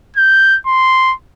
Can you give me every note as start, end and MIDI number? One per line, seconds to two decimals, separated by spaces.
0.16 0.57 91
0.66 1.14 84